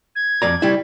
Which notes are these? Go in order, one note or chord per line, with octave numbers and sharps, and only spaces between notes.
G#6
F2 D5 A#5
G3 E4